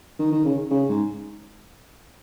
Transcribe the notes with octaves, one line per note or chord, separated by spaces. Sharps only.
D#3
D#3
C#3
C#3
G#2